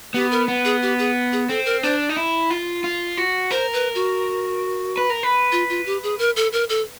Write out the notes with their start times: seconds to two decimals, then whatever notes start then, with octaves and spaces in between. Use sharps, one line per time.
0.14 B3 G4
0.31 A#4
0.48 B3
0.65 G#4
0.82 G4
0.99 G#4
1.32 G#4
1.49 C4 A4
1.65 A#4
1.83 D4 C5
2.09 D#4
2.17 E4
2.50 F4
2.84 F4
3.17 F#4
3.51 A#4 C5
3.73 B4
3.95 F#4
4.97 B4
5.10 A#4
5.23 B4
5.52 F4
5.69 F4
5.86 G4
6.03 G#4
6.19 A#4
6.36 A4
6.53 A#4
6.69 A4